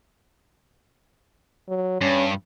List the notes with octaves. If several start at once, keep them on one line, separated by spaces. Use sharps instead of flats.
F#3
G2 C#4